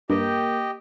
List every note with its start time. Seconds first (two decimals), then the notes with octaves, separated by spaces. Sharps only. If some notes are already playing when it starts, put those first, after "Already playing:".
0.10 G2 A#3 G4 D#5 G5